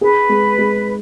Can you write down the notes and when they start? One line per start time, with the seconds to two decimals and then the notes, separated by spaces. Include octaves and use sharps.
0.01 G#4 B4
0.29 G#3
0.58 G#3